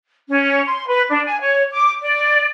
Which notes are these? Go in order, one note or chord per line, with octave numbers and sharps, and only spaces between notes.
C#4
C6
B4
D4
G#5
C#5
D6
D5